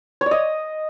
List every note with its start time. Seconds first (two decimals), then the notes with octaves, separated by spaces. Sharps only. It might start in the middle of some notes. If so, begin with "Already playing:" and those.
0.21 C#5
0.26 D5
0.31 D#5